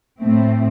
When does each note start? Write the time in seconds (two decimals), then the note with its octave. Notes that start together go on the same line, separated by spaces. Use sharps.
0.20 A2 A3 C4